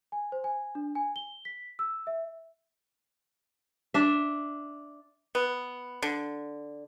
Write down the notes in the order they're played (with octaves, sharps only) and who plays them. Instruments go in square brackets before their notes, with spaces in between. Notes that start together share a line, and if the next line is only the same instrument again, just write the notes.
[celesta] G#5
C5
G#5
D4
G#5
G7
B6
E6
E5
[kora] D4 E5
[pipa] B3
D3